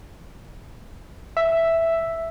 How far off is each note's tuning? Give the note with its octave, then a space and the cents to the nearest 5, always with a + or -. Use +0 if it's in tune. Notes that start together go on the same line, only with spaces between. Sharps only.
E5 +0